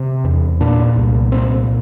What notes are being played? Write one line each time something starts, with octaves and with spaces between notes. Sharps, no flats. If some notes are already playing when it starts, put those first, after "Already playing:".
Already playing: C3
E2
A#2 D4
C2
A#2 C4